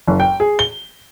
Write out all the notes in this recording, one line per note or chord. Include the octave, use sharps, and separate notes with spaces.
F#1
G5
G#4
G7